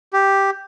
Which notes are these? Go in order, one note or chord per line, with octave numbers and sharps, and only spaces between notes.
G4